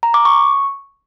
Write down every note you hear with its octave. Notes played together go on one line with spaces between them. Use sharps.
A#5
D6
C#6